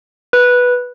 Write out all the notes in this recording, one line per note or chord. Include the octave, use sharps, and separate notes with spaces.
B4